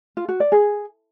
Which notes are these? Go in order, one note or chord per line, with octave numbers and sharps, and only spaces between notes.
F4
F#4
D5
G#4